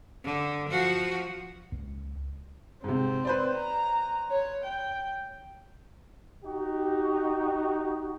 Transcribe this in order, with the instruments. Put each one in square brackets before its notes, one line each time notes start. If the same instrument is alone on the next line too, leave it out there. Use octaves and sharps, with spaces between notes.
[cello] D3
F3 F#4
[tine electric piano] C#2
[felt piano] G#2 C3 [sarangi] C4
[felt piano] B4 C5 D5
[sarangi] A#5
C#5
G5
[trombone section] D#4 F#4 G4